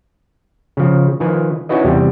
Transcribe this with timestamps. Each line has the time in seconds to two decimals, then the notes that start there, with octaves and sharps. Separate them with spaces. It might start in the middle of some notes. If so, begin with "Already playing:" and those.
0.77 C#3 F3
1.20 D#3 F3 B4 G#5
1.69 C#4 D#4 E4 F#4 B4 D#5
1.85 E2 C3 G3